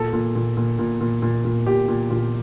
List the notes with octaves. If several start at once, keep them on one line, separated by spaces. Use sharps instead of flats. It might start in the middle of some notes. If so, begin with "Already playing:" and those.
Already playing: A#2 A4
A#2
A#2
A#2
A#2
A#2
A#2
A#2
A#2 G4
A#2
A#2 F4